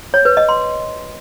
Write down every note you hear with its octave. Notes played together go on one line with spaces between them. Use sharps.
C#5
B4
D#5
C6